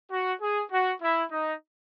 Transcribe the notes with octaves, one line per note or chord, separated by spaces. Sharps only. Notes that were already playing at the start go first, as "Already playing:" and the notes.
F#4
G#4
F#4
E4
D#4